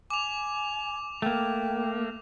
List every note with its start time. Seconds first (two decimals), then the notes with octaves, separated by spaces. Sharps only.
0.10 G#5 D6 F7
1.22 A3 A#3 G5